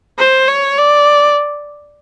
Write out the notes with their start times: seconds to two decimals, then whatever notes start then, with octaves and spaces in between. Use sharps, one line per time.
0.18 C5
0.48 C#5
0.78 D5